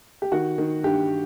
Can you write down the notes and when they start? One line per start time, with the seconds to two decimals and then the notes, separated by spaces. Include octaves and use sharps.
0.22 G4
0.32 D#3 F#4
0.58 D#3
0.83 G2 G4